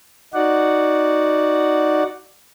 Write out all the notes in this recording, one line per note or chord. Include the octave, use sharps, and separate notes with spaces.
D#4 F#4 D5 F#5